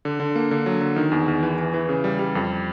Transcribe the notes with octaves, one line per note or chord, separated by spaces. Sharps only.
D3
D3
A#3
D3
F#3
D3
D#3
E2
E2
E3
E3
E3
C#3
G3
G3
F2